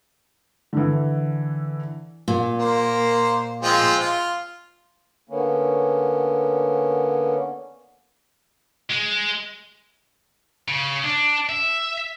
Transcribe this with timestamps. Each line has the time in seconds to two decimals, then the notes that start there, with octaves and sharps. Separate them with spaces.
0.73 D3 E3
2.28 A#2
2.59 A#3 C5
3.62 F3 G#3 C4
3.99 F4
5.29 D3 A#3 B3 C#4
8.90 G#3
10.68 C#3
11.04 D4
11.49 E5